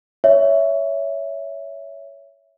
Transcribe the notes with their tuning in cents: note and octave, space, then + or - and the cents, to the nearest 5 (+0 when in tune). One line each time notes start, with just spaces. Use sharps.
C#5 +15 E5 +0